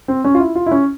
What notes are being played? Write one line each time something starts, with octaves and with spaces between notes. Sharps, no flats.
C4
C#4
F4
E4
F4
E4
C#4